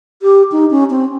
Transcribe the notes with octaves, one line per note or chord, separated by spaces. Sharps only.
G4
D#4
C#4
C4